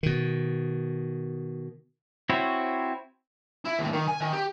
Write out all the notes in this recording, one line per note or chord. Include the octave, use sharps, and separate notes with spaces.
B2 D#3
C4 E4 F#4 C#5
E4
D#2 A2
D#3
G#5
D#3
G4